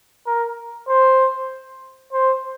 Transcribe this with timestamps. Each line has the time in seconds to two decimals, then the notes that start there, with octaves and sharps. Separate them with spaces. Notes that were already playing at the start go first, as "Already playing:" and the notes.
0.26 A#4
0.89 C5
2.13 C5